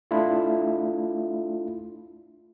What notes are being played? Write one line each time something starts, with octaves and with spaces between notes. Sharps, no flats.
A3 D4 E4 F4